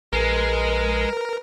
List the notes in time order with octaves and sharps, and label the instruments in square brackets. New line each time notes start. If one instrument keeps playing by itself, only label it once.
[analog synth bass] A#1 [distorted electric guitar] G#3 [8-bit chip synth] A#4 [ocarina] B4